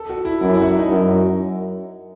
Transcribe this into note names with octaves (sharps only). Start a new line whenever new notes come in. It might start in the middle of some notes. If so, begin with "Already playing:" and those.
Already playing: A4
F#4
E4
F#2 E4
E4
F#4
E4
D#4
F#2